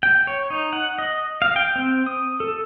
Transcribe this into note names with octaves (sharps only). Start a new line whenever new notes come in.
G5
C#5
D#4
F#5
D#5
F5
G5
C4
D#6
A4